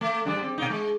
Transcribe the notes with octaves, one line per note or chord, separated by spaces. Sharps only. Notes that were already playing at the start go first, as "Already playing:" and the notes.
A3
G#2 G3 D4
C4
B2 A#3 D#4
G#3